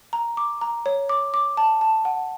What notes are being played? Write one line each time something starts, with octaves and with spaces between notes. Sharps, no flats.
A#5
D6
A#5
C#5
D6
D6
A5
A5
F#5